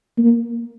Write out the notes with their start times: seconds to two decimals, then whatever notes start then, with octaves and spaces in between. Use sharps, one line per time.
0.18 A#3